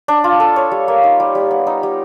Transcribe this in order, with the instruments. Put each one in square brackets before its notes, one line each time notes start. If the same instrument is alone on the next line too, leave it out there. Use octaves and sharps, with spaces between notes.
[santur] D4
F4
A4
C#5
G3
A#3
D#4
G3
G3
B3
D#4
G3